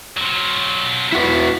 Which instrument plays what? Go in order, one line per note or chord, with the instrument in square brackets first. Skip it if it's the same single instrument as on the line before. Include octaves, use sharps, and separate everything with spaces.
[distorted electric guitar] F#3 F4
[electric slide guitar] E4 F#4 B4